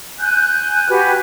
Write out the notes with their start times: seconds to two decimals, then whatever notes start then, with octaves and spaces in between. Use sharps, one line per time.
0.20 G#5 F#6 G6
0.89 F#4 G4 B4 G#5